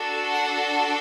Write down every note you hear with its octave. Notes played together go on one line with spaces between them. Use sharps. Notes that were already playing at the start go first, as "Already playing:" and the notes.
Already playing: D4 F#4 A4
F#5